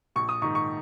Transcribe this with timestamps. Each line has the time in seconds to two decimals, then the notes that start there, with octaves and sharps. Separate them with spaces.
0.16 A#1 C#6
0.29 D#6
0.42 G#2 D#3 C#6
0.55 C#6